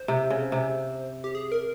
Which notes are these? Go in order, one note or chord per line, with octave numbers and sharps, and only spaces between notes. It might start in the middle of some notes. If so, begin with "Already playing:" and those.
Already playing: C5
C3
C#3
C3
G4
G#4
A#4